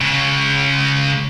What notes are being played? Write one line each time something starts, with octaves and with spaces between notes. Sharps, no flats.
C#2 C#3